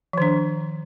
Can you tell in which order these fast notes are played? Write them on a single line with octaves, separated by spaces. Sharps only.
F3 D#3 D4